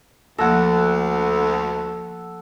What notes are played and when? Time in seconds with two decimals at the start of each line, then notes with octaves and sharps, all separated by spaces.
0.38 D2 F3 A#3 A4 F#5 A#6